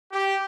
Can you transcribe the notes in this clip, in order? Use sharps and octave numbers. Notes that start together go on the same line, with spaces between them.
G4